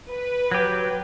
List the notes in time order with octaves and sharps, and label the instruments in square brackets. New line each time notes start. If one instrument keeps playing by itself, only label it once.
[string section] B4
[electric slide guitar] F#3 G4